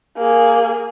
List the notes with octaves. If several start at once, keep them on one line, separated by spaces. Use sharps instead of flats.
A#3 G#4